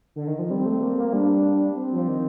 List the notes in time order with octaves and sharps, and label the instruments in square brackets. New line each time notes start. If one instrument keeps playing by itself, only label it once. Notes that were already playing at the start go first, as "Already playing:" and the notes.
[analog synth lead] D3
D#3
F3
[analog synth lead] G3 [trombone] C4
[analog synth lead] A3
A#3
A#3
[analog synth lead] G3 [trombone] D4
[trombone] C4
[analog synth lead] F3
D#3